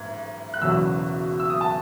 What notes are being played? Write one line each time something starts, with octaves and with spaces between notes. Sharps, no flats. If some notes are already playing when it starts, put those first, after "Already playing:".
Already playing: G#2 G#6
F#6
F#1 E2 B2 F#3 E6
E6
D#6
A5